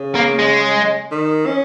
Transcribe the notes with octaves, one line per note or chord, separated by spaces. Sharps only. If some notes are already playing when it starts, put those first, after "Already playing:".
Already playing: C#3
A#3
G#3
D#3
C#4